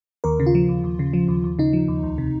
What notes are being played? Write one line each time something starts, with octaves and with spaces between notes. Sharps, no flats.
D#2 A#4
C#3
F4
F3
D#2
D#2
C#3
F3
D#2
D#2
C#3 D#4
F3
D#2
C#2
C3